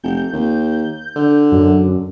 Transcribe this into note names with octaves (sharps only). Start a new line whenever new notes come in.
F1 G6
D#2
D3
F#2